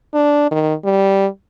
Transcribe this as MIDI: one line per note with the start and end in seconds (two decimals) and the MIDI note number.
0.14 0.47 62
0.51 0.74 51
0.85 1.27 55